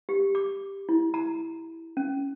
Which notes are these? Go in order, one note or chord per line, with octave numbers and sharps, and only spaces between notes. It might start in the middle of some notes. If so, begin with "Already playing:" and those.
G4
D6
E4
A#5
C#4